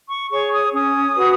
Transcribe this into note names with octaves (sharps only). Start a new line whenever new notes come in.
C#6
G#4 C#5 C#6
D#6
C#4 D#6
F#4 B4